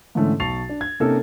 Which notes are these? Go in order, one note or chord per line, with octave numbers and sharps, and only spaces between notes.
G#2 D3 E3 A3 C#4
B1 A5 C#6 A6 C7 F7
D4
G#6
C3 A#3 C#4 D#4 A4 A#4